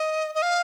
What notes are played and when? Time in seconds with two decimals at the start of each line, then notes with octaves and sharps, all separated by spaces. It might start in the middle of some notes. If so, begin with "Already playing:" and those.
Already playing: D#5
0.35 D#5
0.42 F5